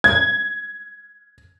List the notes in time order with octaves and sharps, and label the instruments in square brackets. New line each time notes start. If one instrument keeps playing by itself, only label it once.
[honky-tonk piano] G#6